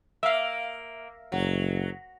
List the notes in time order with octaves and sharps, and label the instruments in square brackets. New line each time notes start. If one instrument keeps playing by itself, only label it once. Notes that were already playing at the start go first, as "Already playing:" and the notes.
[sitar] A#3 [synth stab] E5 F5
[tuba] F#1 [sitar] F#3